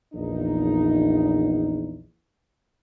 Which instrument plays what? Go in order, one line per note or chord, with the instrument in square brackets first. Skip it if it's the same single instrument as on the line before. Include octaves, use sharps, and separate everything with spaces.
[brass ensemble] A#1 E2 D#4